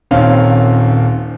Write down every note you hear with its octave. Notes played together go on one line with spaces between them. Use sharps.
D#1 D#3 C4 C#4 F5